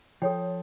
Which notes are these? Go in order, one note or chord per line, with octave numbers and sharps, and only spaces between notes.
F3 A4 C#5 G5